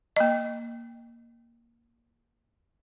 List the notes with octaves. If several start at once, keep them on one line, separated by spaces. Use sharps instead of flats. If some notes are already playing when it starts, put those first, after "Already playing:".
A#3 D#5